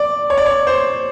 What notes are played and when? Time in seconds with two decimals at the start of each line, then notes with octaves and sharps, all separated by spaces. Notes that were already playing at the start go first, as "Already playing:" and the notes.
Already playing: D5
0.30 C#5
0.37 D5
0.46 C#5
0.67 C5